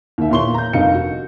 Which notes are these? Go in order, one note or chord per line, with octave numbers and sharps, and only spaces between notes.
D#2 E5
E2 A#2 C#5 C6 C#6 G7
A#5 G6
F1 G2 D#3 D#5 F5 C#7
F#4